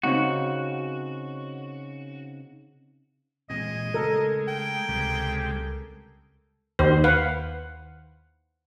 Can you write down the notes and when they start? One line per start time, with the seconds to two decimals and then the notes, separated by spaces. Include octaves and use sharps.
0.03 C#3 C4 D#4 F#4
3.50 A#2 E3 G#3 C4 D#5
3.94 C#3 A3 A4 A#4
4.48 G5
4.89 C#2 C3 G3 G#3
6.79 D#2 C5
7.04 B4 F5 F#5